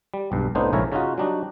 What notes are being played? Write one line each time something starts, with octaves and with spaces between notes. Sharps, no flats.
G3
B1 G2
C2 A2 B3 D4 D#4 C5
A#1 G#2 C#3 E4 A#4 C#5
C#3 C#4 D#4 F4 F#4
F#3 G3 D4 D#4 F#4